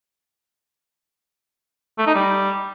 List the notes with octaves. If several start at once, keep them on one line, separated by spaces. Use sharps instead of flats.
A3
D#4
G3